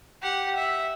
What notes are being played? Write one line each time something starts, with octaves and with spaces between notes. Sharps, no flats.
G4 F#5
E5